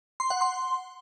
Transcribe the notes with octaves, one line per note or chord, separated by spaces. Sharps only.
C6
F#5
C6